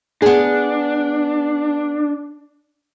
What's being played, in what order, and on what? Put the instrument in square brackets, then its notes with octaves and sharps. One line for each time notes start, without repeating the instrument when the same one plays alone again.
[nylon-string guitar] B3 G#4 [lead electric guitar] D4